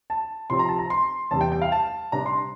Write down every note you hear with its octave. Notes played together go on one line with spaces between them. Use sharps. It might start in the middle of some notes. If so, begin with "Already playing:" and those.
A5
C3 F3 C4 C6
A#5
A5
A#5
C6
E2 C3 G3 A5
G5
G5
F5
A5
C3 G3 D4 A#5
C6